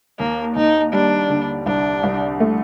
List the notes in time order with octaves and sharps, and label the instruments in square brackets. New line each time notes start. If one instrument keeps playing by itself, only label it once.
[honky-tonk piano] D#2 [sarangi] A#3
[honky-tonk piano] D#2 [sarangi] D#4
[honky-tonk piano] G3 [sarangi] D4
[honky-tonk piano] D3
[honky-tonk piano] C2 [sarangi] D4
[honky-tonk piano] C2
A3